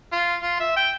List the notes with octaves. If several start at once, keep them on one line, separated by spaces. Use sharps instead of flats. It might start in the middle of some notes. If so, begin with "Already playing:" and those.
F4
F4
E5
G5